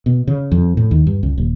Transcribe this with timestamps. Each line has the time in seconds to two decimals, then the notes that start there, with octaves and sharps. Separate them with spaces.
0.06 B2
0.27 C#3
0.52 F2
0.77 A2
0.91 D#2
1.07 G2
1.23 C#2
1.38 D#1